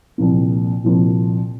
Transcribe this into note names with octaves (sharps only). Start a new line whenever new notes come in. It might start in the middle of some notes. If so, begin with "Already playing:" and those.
C2 A#2 F3 A#3
C2 A#2 F3 A#3